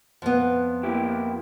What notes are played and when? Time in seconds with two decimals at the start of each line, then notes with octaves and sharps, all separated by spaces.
0.22 F2 B3
0.83 A#3 E4 G4